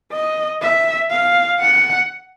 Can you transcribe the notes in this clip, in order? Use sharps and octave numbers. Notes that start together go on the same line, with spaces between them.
D#5
E5
F5
F#5